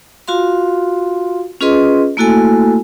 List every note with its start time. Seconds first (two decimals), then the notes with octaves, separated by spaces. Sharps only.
0.28 F4 F#4 F5 C6
1.61 C#4 F4 G#4 B4 D#5 C6
2.17 A3 A#3 E4 F#4 A4 G#5